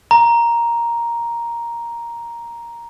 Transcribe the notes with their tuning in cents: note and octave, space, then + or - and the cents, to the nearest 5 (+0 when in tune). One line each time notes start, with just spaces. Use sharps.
A#5 +5